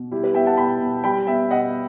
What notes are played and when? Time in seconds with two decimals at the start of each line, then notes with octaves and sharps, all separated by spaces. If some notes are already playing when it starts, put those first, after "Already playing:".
Already playing: B2
0.11 G3 E4 G4
0.23 G4 B4
0.34 B3 E5 G5
0.46 F#5 A5
0.57 B2 G5 B5
0.81 B2
1.04 G3 G5 B5
1.27 B3 E5 G5
1.50 B2 D#5 F#5